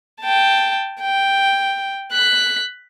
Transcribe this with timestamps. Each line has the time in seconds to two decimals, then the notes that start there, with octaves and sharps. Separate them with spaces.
0.22 G5 A5
1.01 G5
2.12 F#6 B6